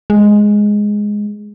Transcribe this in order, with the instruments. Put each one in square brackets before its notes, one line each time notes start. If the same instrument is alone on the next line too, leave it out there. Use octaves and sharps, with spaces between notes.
[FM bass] G#3